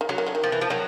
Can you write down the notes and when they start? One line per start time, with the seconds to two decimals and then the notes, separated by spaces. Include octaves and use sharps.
0.01 D#3
0.09 D3 F#3
0.18 D#3
0.26 D3
0.35 D#3
0.44 F3
0.52 E3
0.61 F3
0.70 D#3 F#3